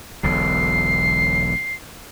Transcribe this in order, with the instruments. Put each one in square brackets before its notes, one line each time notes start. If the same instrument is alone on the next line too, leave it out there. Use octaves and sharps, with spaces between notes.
[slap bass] E1 B1 D3 [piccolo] C7